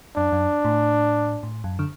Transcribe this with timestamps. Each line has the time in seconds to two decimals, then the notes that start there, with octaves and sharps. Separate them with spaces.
0.17 F#2 D4
0.32 F#2
0.65 A2
1.43 A2
1.64 F#2
1.79 D3